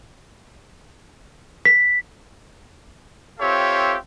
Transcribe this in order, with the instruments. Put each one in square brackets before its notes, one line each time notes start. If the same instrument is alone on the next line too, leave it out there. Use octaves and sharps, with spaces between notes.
[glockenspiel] B6
[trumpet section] C4 F4 G4 A4 C#5 E5